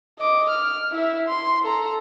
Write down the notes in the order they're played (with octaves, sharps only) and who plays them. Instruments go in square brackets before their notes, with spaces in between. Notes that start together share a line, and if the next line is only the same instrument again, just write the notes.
[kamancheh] D#5 D6
F6
E4 E5
C6
A4 A#5